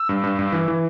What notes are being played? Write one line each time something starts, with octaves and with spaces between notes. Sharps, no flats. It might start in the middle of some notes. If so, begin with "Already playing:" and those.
Already playing: E6
G2
G2
G2
E3
E3